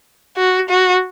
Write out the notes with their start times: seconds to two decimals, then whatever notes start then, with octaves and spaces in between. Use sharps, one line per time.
0.36 F#4
0.69 F#4